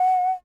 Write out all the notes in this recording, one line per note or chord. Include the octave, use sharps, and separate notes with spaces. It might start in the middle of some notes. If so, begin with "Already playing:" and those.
Already playing: F#5